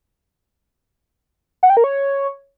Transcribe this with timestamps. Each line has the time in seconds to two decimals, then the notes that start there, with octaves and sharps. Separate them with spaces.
1.63 F#5
1.70 G5
1.77 A#4
1.84 C#5